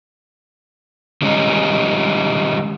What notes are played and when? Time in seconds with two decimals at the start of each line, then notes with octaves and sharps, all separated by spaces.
1.22 D#3 G3 G#3 C#4 D#4